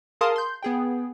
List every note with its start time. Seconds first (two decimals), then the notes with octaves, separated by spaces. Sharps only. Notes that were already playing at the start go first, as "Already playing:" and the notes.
0.21 G#4 A#4 F5 A5 C6 D#6
0.36 C6 G6
0.63 B3 G#4 G5